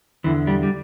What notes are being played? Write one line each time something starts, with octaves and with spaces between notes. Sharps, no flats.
E2 D3 E3
G3
G3